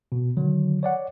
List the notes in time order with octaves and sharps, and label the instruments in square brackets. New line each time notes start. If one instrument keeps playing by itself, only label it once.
[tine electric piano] B2
D3 D#3 F#3
C#5 D5 F#5